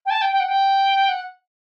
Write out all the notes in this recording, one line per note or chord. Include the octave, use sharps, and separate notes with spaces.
G5
A5
G5
G5
F#5
G5
F#5